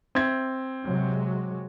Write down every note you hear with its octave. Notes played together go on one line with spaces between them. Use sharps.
C4 E5 G#6
C3 F#3 G#3